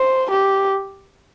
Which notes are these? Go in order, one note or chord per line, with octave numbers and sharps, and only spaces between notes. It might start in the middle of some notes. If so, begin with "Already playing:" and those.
Already playing: C5
G4